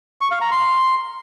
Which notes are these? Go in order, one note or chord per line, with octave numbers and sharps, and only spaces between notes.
C#6
F5
A#5
C6